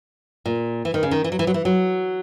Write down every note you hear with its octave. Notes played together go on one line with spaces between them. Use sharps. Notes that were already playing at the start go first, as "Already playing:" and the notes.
A#2
E3
D#3
C#3
D#3
E3
F#3
E3
F#3
E3
F#3